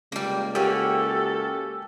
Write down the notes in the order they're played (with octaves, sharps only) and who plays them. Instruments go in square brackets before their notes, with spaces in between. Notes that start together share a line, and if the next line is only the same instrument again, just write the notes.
[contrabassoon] C#2 [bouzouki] G3 A#3
[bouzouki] A#3 C#4 F#4 [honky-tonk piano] G4 [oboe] A4